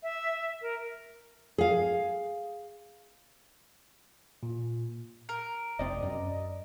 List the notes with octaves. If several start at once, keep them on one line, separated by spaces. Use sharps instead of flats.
E5
A#4
G#4 F5
A#2
A#4
F1 C3 C4 D5 D#5
F#2